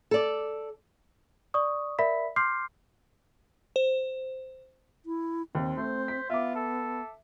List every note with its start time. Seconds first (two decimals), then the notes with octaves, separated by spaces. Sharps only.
0.11 A4 D5
1.54 D5 C#6 D#6
1.99 A#4 D5 E5 B5 B6
2.36 C6 D6 F6 G6 C7
3.76 C5
5.06 E4
5.55 D#2 C4
5.77 A3 C5
6.08 B6
6.30 B3 F4 E5 D6
6.55 A4